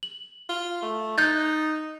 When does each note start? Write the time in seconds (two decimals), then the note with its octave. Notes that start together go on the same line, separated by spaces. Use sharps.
0.03 F#7
0.49 F4
0.82 A3
1.18 D#4 F#6 G6 A6